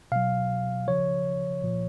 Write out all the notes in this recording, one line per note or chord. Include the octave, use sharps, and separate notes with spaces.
B2 F#3 F5
C#3 F3 C#5
A#2 F3